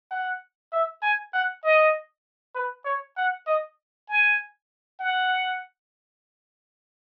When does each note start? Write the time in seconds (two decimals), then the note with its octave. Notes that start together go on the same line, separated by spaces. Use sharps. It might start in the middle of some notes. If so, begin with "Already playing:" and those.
0.11 F#5
0.73 E5
1.02 G#5
1.33 F#5
1.63 D#5
2.55 B4
2.85 C#5
3.17 F#5
3.46 D#5
4.08 G#5
5.00 F#5